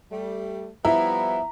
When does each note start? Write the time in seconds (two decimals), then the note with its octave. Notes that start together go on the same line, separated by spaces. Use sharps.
0.11 G3 A3
0.85 F3 G3 B3 E4 A#5